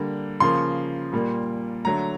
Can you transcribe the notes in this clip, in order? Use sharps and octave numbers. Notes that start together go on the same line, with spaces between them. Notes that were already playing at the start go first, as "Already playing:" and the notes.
Already playing: D3 G3 A#3
C#3 F3 A#3 C6
A#2 G3 A#3
D3 F#3 A3 A#5